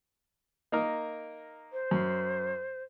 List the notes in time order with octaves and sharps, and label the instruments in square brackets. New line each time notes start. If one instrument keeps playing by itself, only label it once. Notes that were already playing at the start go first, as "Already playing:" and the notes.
[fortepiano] A#3 D#4 A#4
[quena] C5
[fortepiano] F#2